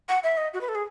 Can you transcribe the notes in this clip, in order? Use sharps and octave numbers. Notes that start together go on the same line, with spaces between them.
F#5
E5
D#5
F#4
B4
A4
G#4